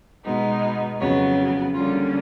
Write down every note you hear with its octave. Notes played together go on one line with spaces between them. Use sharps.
B2 G#3 B3 D#4
F2 C#3 F#3 B3 C#5
D3 G3 A#3 C#4 F4